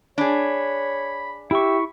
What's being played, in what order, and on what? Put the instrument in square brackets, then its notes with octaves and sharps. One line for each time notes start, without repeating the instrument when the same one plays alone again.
[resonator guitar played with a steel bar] D4 G#4 [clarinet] C#5 [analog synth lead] B5
[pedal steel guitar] E4 C#6 [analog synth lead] G4 [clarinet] E5